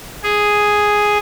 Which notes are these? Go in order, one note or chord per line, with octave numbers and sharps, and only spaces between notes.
G#4